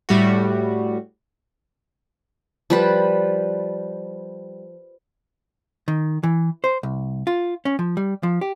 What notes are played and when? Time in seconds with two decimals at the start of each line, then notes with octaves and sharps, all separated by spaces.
0.09 A2 G3 A3 F#4
2.70 F3 G3 B4
5.88 D#3
6.23 E3
6.64 C5
6.83 C2
7.27 F4
7.65 C#4
7.79 F3
7.97 G3
8.23 F3
8.41 G4